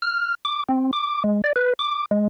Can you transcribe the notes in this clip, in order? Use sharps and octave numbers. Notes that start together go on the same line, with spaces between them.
F6
D6
C4
D6
G#3
D5
B4
D6
G#3